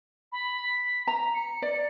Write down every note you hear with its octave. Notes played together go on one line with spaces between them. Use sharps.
B5
B6
A#5
C#7
D5